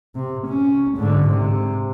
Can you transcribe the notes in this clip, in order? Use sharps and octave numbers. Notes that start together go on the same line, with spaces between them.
C3
C#4
G#2 D3
C3